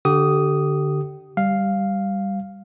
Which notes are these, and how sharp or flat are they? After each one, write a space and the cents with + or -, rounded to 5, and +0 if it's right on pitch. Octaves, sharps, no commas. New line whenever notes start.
D3 +0 G4 -25 D#6 +0
G3 +5 F5 +0